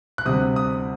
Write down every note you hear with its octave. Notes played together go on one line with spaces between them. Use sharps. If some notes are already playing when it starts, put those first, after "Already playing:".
F#6
D2 C3 G3 C4 D#6
D#6